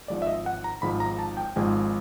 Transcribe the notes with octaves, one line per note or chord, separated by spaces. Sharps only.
G#1 G#2 F3 G#3 D5
E5
D#5
F#5
A#5
G#1 G#2 F3 G#3 B5
A#5
A5
G5
G#1 G#2 F3 G#3 G#5